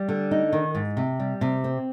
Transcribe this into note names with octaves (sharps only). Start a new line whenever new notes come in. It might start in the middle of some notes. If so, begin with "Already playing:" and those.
Already playing: G3
D3
D#4
D#3
G#2
C3
G3
C3
C4